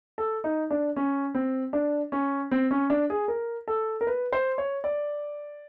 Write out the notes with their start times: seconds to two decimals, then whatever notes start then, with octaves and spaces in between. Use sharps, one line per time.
0.18 A4
0.44 D#4
0.71 D4
0.96 C#4
1.35 C4
1.73 D4
2.12 C#4
2.51 C4
2.71 C#4
2.90 D4
3.10 G#4
3.28 A#4
3.68 A4
4.01 A#4
4.07 B4
4.33 C5
4.58 C#5
4.84 D5